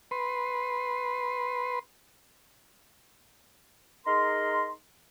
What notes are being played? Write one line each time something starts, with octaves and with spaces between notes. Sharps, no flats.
B4 C6
D#4 G#4 A#4 A#5 C6